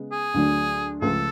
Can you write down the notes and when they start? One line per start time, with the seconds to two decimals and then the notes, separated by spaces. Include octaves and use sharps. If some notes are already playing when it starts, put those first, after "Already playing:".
Already playing: C#3 G#3 B3
0.12 G#4
0.34 D2 D3 F#3 A3 D4
1.02 C#2 C#3 F3 A3 F4 A4